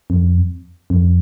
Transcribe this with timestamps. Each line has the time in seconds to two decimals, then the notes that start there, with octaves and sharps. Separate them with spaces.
0.10 F2
0.90 F2